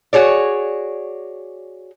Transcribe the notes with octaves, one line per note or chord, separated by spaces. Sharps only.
F#4 G#4 C#5 D5